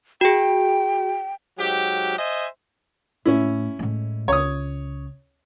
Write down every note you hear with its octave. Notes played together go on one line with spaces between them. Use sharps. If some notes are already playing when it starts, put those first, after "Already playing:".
F#4 G#4 G5
G#2 F#3 G4
C5 D#5 E5 G#5
A2 C#4 E4
A2 G#3
C#2 C#5 D#6